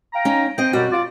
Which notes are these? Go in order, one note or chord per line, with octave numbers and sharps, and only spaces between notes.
F5 G5 A#5
C#4 D#4
C4 D#5 G5
F#2 B2 G3 F#4
F4 D5